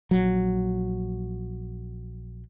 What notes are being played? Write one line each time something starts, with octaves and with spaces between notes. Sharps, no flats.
A#1 F#3